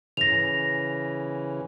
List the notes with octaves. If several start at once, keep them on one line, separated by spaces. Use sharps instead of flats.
C#3 E3 A#6 F7